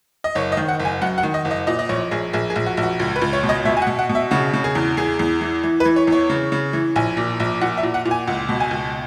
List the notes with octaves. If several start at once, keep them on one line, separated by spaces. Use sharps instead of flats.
D#5
F#1 C#5
D#5
D#3
F#5
F#1
G#5
F#2 F#5
F#5
D#3
D#5
F#1
D#5
A#2 D#5
D#5
A#1 C#5
A#1 G#4
A#1 G#4
G#4
A#1
F#4
A#1
F#4
C#2
B4
C#2
C#5
B2
D#5
B2 E5
G#5
F#5
B2
F#5
B2
E5
C#3 F#4
C#3
G#4
E2
E2 G#4
E2
E3
E3
B4
E3
C#5
E2 C#5
C#3
C#3
E3
A#1 G#5
A#2
A#1
A#2 F#5
E5
A#2
F#5
A#2
G#5
C#2 F#5
B2
G#5
C#2